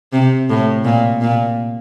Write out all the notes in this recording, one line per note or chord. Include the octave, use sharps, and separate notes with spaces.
C3
A2
A#2
A#2